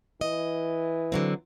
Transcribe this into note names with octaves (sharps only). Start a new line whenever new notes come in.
E3 D#5
D3 F#3 C4